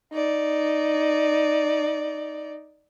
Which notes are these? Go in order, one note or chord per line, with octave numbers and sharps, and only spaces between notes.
D#4 D5